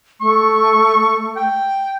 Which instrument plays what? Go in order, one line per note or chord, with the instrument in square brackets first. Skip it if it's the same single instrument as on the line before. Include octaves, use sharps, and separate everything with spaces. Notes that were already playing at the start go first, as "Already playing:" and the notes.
[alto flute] A3 [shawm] C#6
[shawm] G5